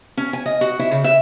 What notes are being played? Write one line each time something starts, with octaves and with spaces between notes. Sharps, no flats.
C#4
G#5
D#5
F#4
E4
C#3
E5